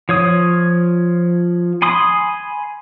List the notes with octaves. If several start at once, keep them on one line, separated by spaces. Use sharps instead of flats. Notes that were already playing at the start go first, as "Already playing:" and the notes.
F3 C#5 D#6
G#5 B5 C6 D#6